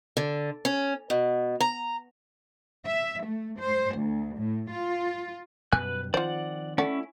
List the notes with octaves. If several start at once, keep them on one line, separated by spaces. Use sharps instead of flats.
D3
C#4
B2
A#5
E5
A3
C5
D2
A2
F4
F#2 B2 G3 B4 G#5 F#6
D#3 F3 C4 F4 C5 D5 F#5
A3 C#4 E4 D5 F#5